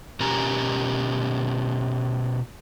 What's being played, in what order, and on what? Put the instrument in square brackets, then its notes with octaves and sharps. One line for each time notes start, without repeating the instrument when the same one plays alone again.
[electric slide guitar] B2 C#4 G4 A#4 G#5 A#5